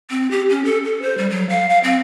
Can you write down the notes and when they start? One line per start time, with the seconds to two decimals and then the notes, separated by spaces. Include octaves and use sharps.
0.10 C4
0.31 G4
0.50 C#4
0.65 A4
0.85 A4
1.02 C5
1.18 G3
1.30 F#3
1.50 F5
1.69 F5
1.84 C4